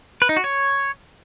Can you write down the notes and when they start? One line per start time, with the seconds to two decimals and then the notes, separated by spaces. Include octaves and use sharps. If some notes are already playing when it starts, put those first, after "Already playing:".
0.22 B4
0.29 D#4
0.37 F#4
0.44 C#5